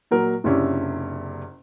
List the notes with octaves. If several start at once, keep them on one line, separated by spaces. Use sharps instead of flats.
A#2 F#3 A#4
F#1 C3 C#4 D4 E4